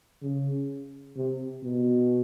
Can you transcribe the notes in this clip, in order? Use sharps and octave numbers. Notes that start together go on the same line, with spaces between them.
C#3
C3
B2